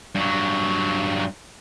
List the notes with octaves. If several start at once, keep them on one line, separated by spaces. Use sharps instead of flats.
G2 F#3